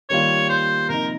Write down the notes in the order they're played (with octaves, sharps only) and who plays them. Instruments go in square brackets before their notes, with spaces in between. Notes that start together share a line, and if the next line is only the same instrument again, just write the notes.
[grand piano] D#3 G3 A#3 F4 [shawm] C#5
[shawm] C5
[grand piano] C3 F3 A#3 D#4 [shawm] A#4